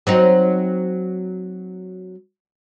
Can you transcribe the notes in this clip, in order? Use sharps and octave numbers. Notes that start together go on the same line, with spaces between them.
F#3 C4 D#4